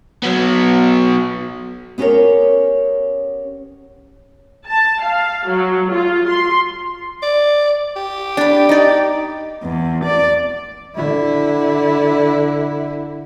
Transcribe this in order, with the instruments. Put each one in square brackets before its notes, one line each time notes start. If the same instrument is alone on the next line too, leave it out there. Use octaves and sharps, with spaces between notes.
[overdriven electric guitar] F#3 B3
[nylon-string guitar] B3 C#4 G4 G#4 A#4 C#5
[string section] A5
F5
F#3
F4
C6
[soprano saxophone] D5
G4
[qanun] D4 B5
D#4 D5
[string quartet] E2
D5
[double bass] D3 E4